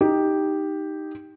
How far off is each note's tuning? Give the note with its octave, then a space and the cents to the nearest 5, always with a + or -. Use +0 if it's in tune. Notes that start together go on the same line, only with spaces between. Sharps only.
D#4 +0 G4 +0